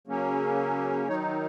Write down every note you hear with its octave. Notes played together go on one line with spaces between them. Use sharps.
C#3 F#3 A#3 C#4
D#3 F#3 D#4 C#5